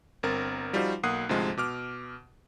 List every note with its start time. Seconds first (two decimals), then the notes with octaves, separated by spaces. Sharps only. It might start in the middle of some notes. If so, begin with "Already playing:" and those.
0.23 G1 C4 A#4 A6
0.73 F3 G3 D#4 F4 F#4 C5
1.03 B1 A#3 F#5 D#6 F#6 C7
1.29 D2 G#2 C3 F3 G#3
1.57 B2 D6 F6